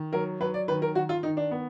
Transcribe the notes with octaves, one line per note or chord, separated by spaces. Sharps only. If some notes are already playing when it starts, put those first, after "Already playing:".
Already playing: D#3
F#3 A#4
F#3 B4
D5
D#3 B4
A#4
D#3 F#4
F4
D#3 D#4
D4
B3